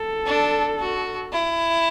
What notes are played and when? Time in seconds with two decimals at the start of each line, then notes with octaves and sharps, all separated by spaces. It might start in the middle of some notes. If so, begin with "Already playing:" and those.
Already playing: A4
0.26 D4
0.79 F#4
1.32 E4